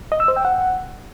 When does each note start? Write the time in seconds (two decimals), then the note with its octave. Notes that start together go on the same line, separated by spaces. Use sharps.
0.12 D#5
0.20 E6
0.28 C5
0.37 G5
0.45 F#5